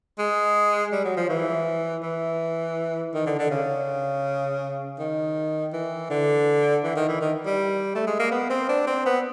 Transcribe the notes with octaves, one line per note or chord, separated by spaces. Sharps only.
G#3
G3
F#3
F3
E3
E3
D#3
D3
D3
C#3
D#3
E3
D3
E3
D#3
E3
D#3
G3
A3
G#3
A#3
B3
C4
D4
C4
B3